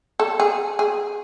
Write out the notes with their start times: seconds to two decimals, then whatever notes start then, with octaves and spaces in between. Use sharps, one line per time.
0.20 A4
0.40 G#4
0.79 G#4